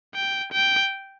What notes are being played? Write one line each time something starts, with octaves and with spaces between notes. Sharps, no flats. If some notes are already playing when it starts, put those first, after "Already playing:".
G5
G5